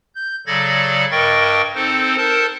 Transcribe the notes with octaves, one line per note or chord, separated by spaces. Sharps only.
G6
C#3 F#3 A4 D5 G#6 A#6
G2 A#4 D#5 G5 C#6 A6
C4 D#4 A4 C5
A4 A#4 C5 A5